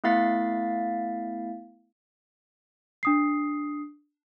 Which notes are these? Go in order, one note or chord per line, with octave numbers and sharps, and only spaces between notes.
A3 B3 E4 F5 A6 B6
D4 D#6 C7